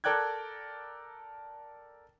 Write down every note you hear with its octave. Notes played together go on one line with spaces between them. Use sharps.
A4 A#4 D5 G5 F#6 G#6